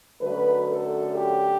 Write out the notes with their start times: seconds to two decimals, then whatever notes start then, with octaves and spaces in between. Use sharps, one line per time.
0.20 F#2 D3 F#3 A3 B4
0.68 A4
1.14 G4